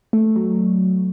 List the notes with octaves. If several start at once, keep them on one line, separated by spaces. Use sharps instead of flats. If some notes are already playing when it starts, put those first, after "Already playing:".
A3
F#3